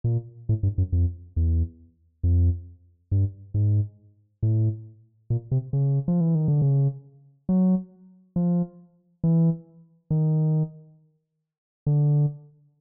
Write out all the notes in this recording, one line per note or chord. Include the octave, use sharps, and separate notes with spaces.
A#2
A2
G2
F#2
F2
E2
F2
G2
G#2
A2
A#2
C3
C#3
F3
E3
D#3
D3
C#3
F#3
F3
E3
D#3
D3